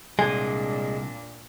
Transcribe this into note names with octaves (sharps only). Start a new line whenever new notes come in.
C2 A#2 G#3 D4 G#5